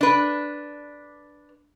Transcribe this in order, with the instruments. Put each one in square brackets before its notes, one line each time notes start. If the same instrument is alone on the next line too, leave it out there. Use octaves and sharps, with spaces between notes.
[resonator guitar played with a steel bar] D4 B4